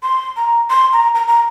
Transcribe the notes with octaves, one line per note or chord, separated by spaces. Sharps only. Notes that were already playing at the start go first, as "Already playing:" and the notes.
C6
A#5
C6
A#5
A#5
A#5